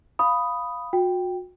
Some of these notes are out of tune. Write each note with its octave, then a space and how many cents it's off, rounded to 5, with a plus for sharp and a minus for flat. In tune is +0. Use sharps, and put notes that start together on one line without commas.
F5 +0 B5 +0 D#6 +0
F#4 -35 G5 +0